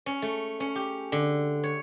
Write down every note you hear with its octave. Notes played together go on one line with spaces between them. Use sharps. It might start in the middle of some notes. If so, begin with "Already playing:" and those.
C#4
A3
C#4
G4
D3
C#5